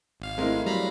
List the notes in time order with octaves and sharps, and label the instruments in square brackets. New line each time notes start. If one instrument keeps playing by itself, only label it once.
[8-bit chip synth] G#1 F5
[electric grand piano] G#3 A3 A#4 [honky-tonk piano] C4 E4
[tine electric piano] F#3 G3 [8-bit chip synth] F5 A#5 B5